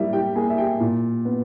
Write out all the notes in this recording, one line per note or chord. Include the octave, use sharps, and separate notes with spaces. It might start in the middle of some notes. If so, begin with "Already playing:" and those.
Already playing: G3 A#3 E4 E5
G4 G5
A#3 G#4 G#5
E5
G4 G5
A#2
B3